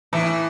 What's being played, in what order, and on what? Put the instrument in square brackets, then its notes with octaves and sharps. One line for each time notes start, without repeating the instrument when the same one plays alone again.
[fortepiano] A2 [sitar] E3